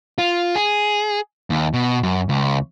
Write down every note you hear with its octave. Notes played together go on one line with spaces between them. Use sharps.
F4
G#4
D#2
B2
F#2
C#2